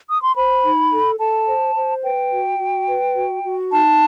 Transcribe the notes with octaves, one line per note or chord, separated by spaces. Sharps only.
D#6
C6
C5 B5
D#4
A4
A4 A5
C5
C5
B4 G5
F#4
F#4
B4
F#4
F#4
D#4 A5